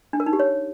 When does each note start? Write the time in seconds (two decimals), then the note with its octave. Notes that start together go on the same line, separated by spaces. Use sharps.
0.13 D4
0.20 A#4
0.26 D#4
0.33 G4
0.39 C#5